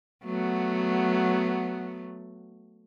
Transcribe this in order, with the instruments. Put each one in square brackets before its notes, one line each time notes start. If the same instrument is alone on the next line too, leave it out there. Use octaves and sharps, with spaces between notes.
[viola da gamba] F#3 A3 B3